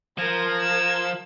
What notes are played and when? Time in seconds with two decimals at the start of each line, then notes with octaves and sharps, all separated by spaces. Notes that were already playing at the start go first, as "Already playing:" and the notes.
0.18 F3 A#4 A#5 G#6 A#6
0.61 E6